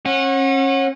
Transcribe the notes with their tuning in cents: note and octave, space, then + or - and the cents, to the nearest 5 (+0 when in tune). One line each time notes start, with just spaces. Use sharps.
C#4 -35 F#5 -15